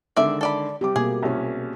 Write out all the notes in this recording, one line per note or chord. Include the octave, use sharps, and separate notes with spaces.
D3 D#3 G#3 D5 E5
A4 D5 B5
C3 G3 G4 D6
B2 A#3 G#4
C2 C#4